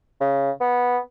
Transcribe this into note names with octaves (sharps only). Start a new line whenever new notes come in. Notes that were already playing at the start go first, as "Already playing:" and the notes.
C#3
B3